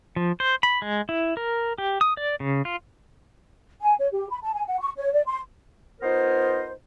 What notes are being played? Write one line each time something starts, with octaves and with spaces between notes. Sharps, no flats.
F3
C5
B5
G#3
E4
A#4
G4
D#6
D5
C#3
F4
G#5
C#5
G4
B5
A5
G#5
F#5
C#6
C#5
D5
C6
B3 D#4 F4 A#4 C5